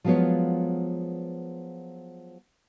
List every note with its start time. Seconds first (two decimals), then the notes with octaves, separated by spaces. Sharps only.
0.04 F3 F#3 G#3 B3 F4 C#5